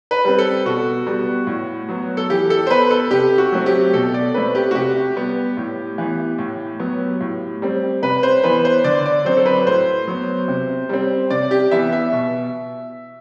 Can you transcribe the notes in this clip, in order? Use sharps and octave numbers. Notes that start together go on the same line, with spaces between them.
B4
G3 C4
A4
B2 F#4
G3 B3
A2
F#3 B3
A4
E3 G4
A4
C5
B3 B4
A4
C3 G4
F#4
F#3 A3 C4
G4
B2 A4
D5
A3 C4 B4
G4
F#4
C3 G4
G3 B3
A2
E3 B3
A2
F#3 B3
A2
G3 C4
C3 B4
C5
E3 B3 B4
C5
D3 D5
D5
F#3 C4 C5
A4
B4
A2 C5
F#3 B3
C3
G3 C4
C3 D5
G4
E3 B3 E5
E5
B2